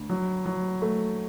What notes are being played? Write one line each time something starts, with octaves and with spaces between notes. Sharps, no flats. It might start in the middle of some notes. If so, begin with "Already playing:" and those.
Already playing: D2
F#3
F#3
A3